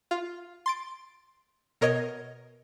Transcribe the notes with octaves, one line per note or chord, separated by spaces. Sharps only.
F4
C6 A6 D7
B2 A#4 C#5 D#5 G#6